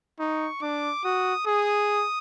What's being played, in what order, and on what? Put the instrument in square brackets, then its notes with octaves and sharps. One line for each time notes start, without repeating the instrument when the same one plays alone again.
[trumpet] D#4 [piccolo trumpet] C#6
[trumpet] D4 [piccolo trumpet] D6
[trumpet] F#4 [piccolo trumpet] D#6
[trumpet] G#4 [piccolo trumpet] D#6